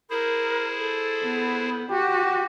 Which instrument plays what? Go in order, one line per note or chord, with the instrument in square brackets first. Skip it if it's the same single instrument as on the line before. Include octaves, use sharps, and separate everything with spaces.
[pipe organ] E4 G#4 C5 [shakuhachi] A#4
[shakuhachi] A4
[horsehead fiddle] B3
[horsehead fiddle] F#4 [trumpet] G4